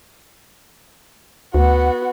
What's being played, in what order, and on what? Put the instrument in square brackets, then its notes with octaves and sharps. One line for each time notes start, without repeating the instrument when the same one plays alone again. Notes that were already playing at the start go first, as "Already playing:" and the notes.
[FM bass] D2 [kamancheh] B3 F#4